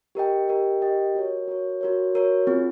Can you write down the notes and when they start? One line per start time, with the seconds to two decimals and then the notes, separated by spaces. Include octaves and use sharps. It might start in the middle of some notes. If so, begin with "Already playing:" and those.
0.15 G4 A#4 D#5 G5
0.48 G4 A#4 D#5 G5
0.82 G4 A#4 D#5 G5
1.15 F#4 A#4 C#5
1.48 F#4 A#4 C#5
1.81 F#4 A#4 C#5
2.14 F#4 A#4 C#5
2.47 C4 F4 G#4